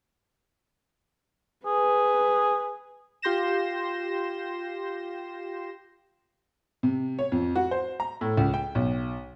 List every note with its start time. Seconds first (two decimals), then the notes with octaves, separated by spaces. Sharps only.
1.66 G#4 B4
3.22 F4 G4 C6 G6 A#6 E7
6.83 C3
7.19 C#5
7.32 F2
7.56 F#4
7.71 C5
8.00 A#5
8.21 A2
8.37 C#2
8.54 G5
8.75 B1